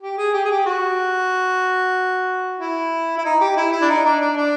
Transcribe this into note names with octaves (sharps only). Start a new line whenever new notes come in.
G4
G#4
G4
G#4
G4
F#4
E4
E4
D#4
G4
E4
E4
D4
D#4
D4
D4
D4